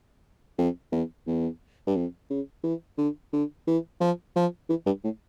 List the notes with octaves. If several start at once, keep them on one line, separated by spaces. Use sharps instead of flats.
F2
E2
E2
G2
F2
C#3
E3
D3
D3
E3
F3
F3
E3
G2
A2